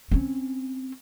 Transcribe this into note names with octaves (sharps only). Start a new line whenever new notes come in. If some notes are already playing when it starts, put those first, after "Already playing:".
C4 C#4